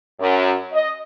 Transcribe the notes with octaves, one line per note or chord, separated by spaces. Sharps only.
F#2
D#5